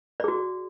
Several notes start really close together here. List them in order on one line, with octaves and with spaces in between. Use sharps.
D5 G#4 F#4